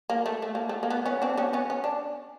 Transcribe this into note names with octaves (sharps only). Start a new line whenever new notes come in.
A#3
A3
A3
A#3
A3
A#3
B3
B3 C#4
C4 D4
B3 C#4
B3 C#4
C#4
D4